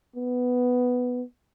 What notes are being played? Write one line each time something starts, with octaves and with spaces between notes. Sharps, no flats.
B3